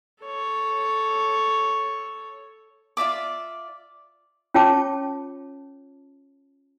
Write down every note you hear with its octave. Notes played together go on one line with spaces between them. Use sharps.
A4 C#5
F4 D5 E5 D6
C#4 F4 C#5 G5 A5 D6